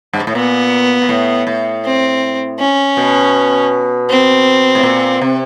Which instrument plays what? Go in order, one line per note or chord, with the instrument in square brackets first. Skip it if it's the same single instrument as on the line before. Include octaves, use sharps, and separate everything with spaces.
[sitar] G2
G#2
A2
[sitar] A#2 [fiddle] B3
[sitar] A#2
A2
A2
[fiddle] C4
C#4
[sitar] B2
[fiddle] C4
[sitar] A2
A#2
C3